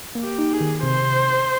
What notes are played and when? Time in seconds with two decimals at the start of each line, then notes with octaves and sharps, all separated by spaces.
0.15 A#3
0.23 G4
0.38 D#4
0.53 G#4
0.61 D#3
0.83 C3 C5